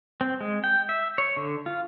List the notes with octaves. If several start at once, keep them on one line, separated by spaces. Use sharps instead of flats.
C4
G#3
G5
E5
C#5
D3
F4